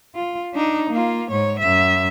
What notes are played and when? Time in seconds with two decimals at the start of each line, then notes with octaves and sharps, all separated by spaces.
0.15 F4
0.54 D4 D#4
0.90 A#3 F4
1.31 G#2 C#5
1.60 F#2 E5